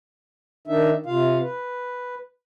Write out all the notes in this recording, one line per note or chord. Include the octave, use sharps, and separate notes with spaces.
D#3 D4 D#4 E5
C3 F4 F5
B4